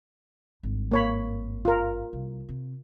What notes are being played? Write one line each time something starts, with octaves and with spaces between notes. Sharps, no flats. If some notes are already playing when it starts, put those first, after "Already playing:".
G#1 G2
A#3 C#5 B5
F4 A#4
C2
C3